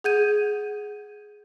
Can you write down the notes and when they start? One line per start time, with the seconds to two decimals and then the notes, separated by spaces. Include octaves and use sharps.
0.04 G#4 F#5 G6 G#6 D#7